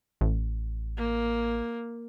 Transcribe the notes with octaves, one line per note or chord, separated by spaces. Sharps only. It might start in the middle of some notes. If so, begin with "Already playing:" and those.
A1
A#3